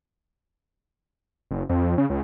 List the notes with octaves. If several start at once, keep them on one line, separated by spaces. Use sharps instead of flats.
F#1
F2
C#3
C#2